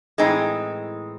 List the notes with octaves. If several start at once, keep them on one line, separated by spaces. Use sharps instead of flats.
A2 E3 G#3 C4 D#4